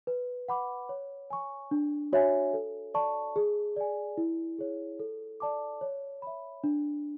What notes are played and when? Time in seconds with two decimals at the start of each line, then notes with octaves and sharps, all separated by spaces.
0.07 B4
0.48 F#5 B5 D6
0.89 C#5
1.30 G#5 C#6
1.71 D4
2.13 F#4 C#5 E5 G#5
2.54 A4
2.94 D5 A5 C#6
3.36 G#4
3.76 D5 G#5
4.18 E4
4.58 G#4 C#5
4.99 A4
5.40 D5 A5 D6
5.81 C#5
6.22 E5 B5
6.64 D4